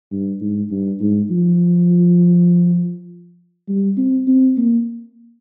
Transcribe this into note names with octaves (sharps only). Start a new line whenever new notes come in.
G2
G#2
G2
G#2
F3
G3
C4
C4
A#3